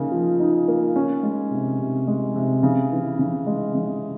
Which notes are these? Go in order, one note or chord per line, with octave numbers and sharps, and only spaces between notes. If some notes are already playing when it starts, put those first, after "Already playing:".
Already playing: C#3 A#3 D#4
F3
D#4
A#3
C#4
G#3
C3
C3
G#3
C3
C#3
E3
C#3
G#3
C#3